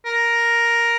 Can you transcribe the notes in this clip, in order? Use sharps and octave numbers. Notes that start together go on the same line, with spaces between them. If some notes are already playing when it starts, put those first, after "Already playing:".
A#4